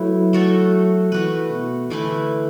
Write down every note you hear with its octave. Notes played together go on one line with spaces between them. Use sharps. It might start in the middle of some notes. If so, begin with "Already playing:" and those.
Already playing: F#3 A3 E4 B4
A3 F#4 A4
E3 A3 F#4 B4
B2
D3 E3 A3 E4 B4